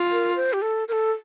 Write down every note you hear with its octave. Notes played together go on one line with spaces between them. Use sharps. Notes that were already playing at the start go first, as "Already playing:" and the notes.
Already playing: F4
A#4
C5
G4
A4
A#4
A4